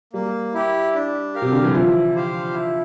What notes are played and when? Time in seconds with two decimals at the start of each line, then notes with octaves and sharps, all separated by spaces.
0.13 G3 A#3
0.54 E4 G4
0.94 D4
1.34 G4 A#4 F5
1.42 C3
1.52 D3
1.64 E3
1.74 F3 E4
2.15 G4 C5 F5
2.54 E4